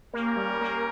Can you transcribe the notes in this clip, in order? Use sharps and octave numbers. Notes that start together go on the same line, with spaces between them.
A#3 C#4 G4 A#4
G3
A#3